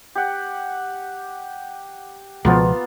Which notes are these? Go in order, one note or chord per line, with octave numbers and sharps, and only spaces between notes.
G4 F#5
C#2 B2 F3 A#3 B3 F4